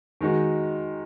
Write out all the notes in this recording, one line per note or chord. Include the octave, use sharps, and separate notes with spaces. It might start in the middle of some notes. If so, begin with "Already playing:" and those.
D#3 G#3 D#4 F#4